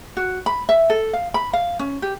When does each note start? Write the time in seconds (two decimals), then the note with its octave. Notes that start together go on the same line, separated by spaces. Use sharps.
0.17 F#4
0.46 B5
0.69 E5
0.90 A4
1.13 F5
1.34 B5
1.53 F5
1.79 C#4
2.02 G4